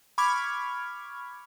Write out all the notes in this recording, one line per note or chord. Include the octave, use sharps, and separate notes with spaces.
B5 C#6 D6 F6 G#6